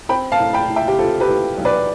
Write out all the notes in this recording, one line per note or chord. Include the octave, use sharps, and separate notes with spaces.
C4 G5 B5
F5 A5
A2
G5 B5
A2
E5 G5
G4
C4 F4 A4
G4 B4
A2
B1
B4 D5